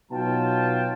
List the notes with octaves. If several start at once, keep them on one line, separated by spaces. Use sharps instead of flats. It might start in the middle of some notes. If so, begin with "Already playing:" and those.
B2 F#3 D#4 F4 G5 A5